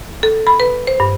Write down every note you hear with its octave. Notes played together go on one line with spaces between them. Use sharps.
A4
B5
B4
C5
G2